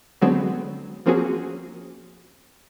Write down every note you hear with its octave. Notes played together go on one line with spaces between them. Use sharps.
D3 F#3 G#3 B3 C4
F3 A#3 C4 C#4 F#4 G#4